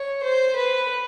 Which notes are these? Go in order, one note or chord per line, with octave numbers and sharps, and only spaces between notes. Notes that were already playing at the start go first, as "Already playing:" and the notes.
Already playing: C#5
C5
B4